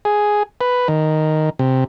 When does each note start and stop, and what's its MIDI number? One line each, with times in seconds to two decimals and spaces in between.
0.05 0.43 68
0.61 0.88 71
0.88 1.50 51
1.59 1.84 48